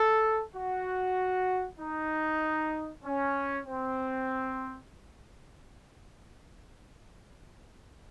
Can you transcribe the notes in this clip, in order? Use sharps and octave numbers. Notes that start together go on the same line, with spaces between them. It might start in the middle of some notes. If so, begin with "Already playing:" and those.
Already playing: A4
F#4
D#4
C#4
C4